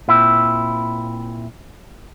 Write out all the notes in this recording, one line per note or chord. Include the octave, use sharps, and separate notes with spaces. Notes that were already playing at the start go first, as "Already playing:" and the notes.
A#2 C4 E4